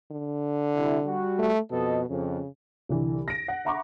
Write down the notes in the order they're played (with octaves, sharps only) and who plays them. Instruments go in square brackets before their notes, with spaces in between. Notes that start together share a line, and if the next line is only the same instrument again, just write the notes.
[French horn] D3
[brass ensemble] C3 G3 E4
G3 F#4
[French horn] A3
[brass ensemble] F2 A4 D#5 [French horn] B2
[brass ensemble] F2 [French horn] C#3
[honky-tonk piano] C2 D3 E3
A#6 D7
F#5
E5 F#5 A#5 B5 C#6 D6